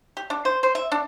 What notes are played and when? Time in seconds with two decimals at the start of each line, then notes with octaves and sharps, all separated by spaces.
0.17 G4
0.30 D4
0.45 C5
0.63 C5
0.75 E5
0.92 D4